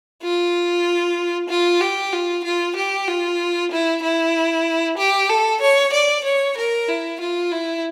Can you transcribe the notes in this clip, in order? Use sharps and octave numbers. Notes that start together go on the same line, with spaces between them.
F4
F4
G4
F4
F4
G4
F4
E4
E4
G4
A4
C#5
D5
C#5
A#4
E4
F4
E4